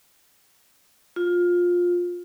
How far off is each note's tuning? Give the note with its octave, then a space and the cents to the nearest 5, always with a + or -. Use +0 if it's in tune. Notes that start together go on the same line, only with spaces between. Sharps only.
F4 +15